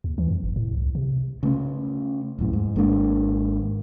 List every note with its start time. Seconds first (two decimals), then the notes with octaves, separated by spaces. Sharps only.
0.04 D#2
0.18 E3
0.30 F2
0.43 F#1
0.56 A2
0.73 C2
0.95 C3
1.43 C#3 A3 B3 C#4
2.39 D#1 F#2 A2
2.53 G#2
2.76 G#1 G#3 A#3 D4